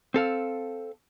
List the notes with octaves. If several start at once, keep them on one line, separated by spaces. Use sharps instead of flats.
C4 A4 F5